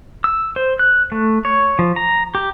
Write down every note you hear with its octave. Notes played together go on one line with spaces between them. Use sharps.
E6
C5
F#6
A3
C#5
F3
A#5
G4